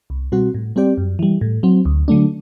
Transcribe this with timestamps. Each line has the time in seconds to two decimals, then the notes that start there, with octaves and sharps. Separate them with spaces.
0.10 C2
0.32 B2 G3 C4 F#4
0.54 A2
0.76 G3 C4 G4 D5
0.98 F#2
1.19 E3 G3
1.41 A2
1.63 F#3 C4
1.85 D2
2.08 D3 F#3 A3 D4